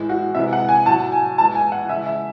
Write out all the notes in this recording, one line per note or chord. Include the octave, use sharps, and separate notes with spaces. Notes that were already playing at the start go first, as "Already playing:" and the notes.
Already playing: A2 E3 G#3
F#4
C3 E3 G#3 E5
F#5
G#5
A2 F#3 A5
G#5
A2 E3 G#3 A5
G#5
F#5
C#3 E3 G#3 E5
E5